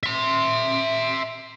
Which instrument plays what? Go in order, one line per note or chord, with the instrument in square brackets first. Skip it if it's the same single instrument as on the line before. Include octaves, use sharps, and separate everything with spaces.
[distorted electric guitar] E5 C6